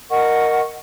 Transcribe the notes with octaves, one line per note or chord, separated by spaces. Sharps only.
A#4 D#5 F#5 C#6